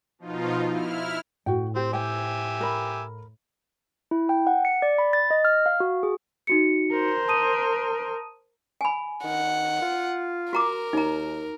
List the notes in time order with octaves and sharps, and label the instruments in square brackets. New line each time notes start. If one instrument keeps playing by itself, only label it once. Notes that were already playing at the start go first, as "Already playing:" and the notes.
[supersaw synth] B2 F3 D#4 F4
E4 F6
[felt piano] A2 [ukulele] F#4 G5
[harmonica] C4 [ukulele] G4
[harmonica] G4 E5 G#5 [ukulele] C5 G5
[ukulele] A#4 B5
[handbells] E4
G5
F#5
C#7
D5
B5
A6
D#5
F6
F5
F#4
G#4
[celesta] D#4 F#4 C#7
[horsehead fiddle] A#4 C5
[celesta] A5 D#6 D#7
[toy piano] G#5 B5
[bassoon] D#3 [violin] F#5
[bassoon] F4
[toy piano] F#4 A#5 D6 [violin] A#4
[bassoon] D#2 [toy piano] D#4 A#5